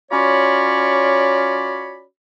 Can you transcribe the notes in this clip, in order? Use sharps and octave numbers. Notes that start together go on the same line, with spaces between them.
C#4 F4 F#4 C#5 D5 B5